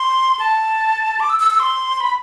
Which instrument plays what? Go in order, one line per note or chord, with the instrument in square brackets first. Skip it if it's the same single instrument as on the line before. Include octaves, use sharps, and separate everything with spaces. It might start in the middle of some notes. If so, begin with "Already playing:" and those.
Already playing: [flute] C6
A5
D6
E6
E6
E6
C6
B5